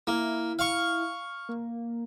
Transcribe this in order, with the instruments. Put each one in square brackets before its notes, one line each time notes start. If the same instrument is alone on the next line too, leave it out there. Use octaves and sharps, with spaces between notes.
[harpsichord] A#3 [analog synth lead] E4
[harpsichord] F5 C#6
[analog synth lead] A#3